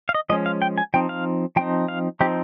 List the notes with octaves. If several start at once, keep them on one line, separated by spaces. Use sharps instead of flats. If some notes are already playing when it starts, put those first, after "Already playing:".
F5
D#5
F3 G#3 C#4 D#5
F5
G5
G#5
F3 C4 D#4 G5
F5
F3 C4 D#4 G5
F5
F3 C4 D#4 G4